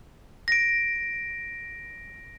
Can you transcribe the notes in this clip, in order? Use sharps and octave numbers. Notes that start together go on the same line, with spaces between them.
A#6 D7